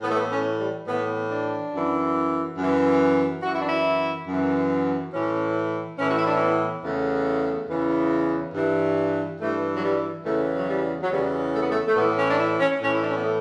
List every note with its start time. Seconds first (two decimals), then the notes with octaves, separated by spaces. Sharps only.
0.02 A2 E3 B3
0.09 A3
0.16 B3
0.31 C#4
0.59 G3
0.87 A2 E3 B3
1.30 D4
1.72 F#2 E3
2.58 F#2 E3
3.43 F#2 E3 F#4
3.51 E4
3.59 D4
3.67 E4
4.28 F#2 E3
5.13 A2 E3 C#4
5.99 A2 E3 C#4
6.09 F#4
6.17 E4
6.25 D4
6.33 C#4
6.41 B3
6.84 E2 C#3 E3 A3
7.69 E2 C#3 E3
8.54 G2 E3
9.40 G2 E3 A3
9.74 F#3
9.82 G3
10.25 E2 C#3 E3 A3
10.55 F#3
10.68 G3
11.02 F#3
11.10 E2 C#3 E3 G3
11.53 A3
11.61 B3
11.69 A3
11.88 A3
11.96 A2 B3
11.99 E3
12.17 C#4
12.29 D4
12.38 E4
12.60 C#4
12.80 A2 E3 C#4
12.93 E4
13.00 D4
13.08 C#4
13.16 B3
13.23 A3